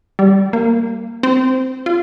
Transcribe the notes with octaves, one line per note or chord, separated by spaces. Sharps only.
G3
A#3
C4
F4